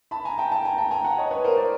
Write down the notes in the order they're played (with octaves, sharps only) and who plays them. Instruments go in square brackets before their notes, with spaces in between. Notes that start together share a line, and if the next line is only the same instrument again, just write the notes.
[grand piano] A5 B5
G#5 A#5
G5 A5
G5 A5
G#5 A#5
G5 A5
G#5 A#5
F#5 G#5
C#5 D#5
B4 C#5
A#4 C5
C5 D5